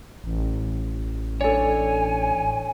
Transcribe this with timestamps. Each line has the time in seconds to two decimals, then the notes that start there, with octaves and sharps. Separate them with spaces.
0.24 A1
1.41 D4 A4 C#5 G#5